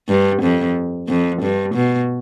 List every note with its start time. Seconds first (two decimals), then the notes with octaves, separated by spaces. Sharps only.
0.09 G2
0.42 F2
1.09 F2
1.42 G2
1.75 B2